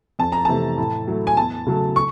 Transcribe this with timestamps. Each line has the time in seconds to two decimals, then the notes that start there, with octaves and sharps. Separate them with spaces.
0.19 F2 A5
0.32 A#5
0.45 C3 E3 A3 A5
0.78 A2
1.08 F#3 A3
1.27 G#5
1.37 E2 A5
1.66 C#3 F#3 A3
1.96 C#6